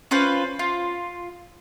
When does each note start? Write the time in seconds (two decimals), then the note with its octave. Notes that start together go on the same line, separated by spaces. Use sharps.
0.11 C#4 F4 B4 C5
0.59 F4